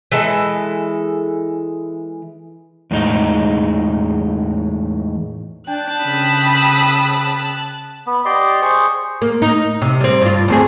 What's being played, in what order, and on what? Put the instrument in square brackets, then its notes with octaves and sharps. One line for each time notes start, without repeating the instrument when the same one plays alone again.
[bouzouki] E3 G#3 A4
[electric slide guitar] E2 A2 G#3 D#4
[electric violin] D4 [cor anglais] G5 [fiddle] A5 F#6
[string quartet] C#3 E6 [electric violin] B5 D#6
[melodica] B3
G4 D5 D#5 C6
G#4 C5 C#6
[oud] A#3
D#4
C3
G3 C4
G2 F4
D2 C4 G#4